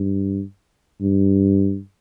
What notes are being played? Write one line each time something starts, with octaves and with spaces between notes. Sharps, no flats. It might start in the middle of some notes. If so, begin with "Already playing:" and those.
Already playing: G2
G2